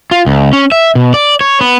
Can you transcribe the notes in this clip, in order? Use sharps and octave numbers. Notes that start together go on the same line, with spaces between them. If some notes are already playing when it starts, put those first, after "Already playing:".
F4
C#2
C#4
E5
B2
D5
C#5
B3